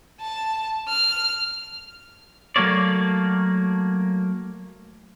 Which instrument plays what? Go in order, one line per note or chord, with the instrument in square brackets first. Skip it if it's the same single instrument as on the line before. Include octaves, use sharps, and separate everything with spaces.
[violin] A5
F6
[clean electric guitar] F#3 A3 A#3 C#5 D5